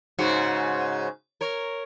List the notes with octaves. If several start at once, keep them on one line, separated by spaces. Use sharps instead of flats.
G#2 C#3 F#4
A#4 C#5